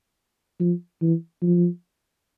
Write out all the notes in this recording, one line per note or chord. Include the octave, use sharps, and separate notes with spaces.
F3
E3
F3